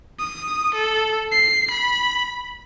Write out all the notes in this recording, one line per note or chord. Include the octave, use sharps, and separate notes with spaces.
D#6
A4
C7
B5